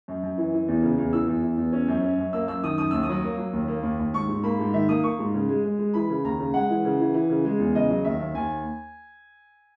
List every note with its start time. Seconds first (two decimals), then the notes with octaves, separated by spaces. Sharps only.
0.08 F#2
0.23 F#2
0.38 E3
0.53 E3
0.68 E2
0.83 C#3
0.98 E2
1.13 E3 E6
1.27 E2
1.43 E3
1.57 E2
1.72 C#4
1.88 F#2
2.02 C#4
2.18 F#2
2.33 A#3 E6
2.48 F#2 E6
2.63 D#3 D#6
2.78 F#2 D#6
2.91 D#2 E6
3.03 D#6
3.09 F#3
3.24 A#3
3.38 F#3
3.53 D#2
3.68 A#3
3.83 D#2
3.99 D#2
4.13 G#2 C#6
4.29 G#2
4.43 A#3 B5
4.59 G#2
4.74 D#3 E5
4.88 A#3 D#6
5.03 A#3 C#6
5.19 G#2
5.34 C#3
5.49 G#3
5.64 G#3
5.79 G#3
5.94 E3 B5
6.10 C#3
6.24 D#2 A#5
6.39 C#3
6.54 G#3 F#5
6.70 E3
6.85 C#3
7.00 E3
7.14 E3
7.30 C#3
7.45 G#3
7.59 E2
7.75 C#3 D#5
7.89 F#3
8.05 D#2 E5
8.20 D#2
8.35 D#2 G#5